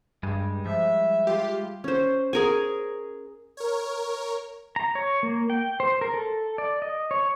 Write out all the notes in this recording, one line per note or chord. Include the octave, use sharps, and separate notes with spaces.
G2 G3 G#3 G#5
F3 E5
F4 G4
C#4 C5
G#4 A#4 G#5
A#4 C#5
A#5
C#5
A#3
G5
C5
A#4
A4
D5
D#5
C#5